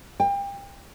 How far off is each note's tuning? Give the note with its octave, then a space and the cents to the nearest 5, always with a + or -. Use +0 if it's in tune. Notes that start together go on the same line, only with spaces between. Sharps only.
G5 +30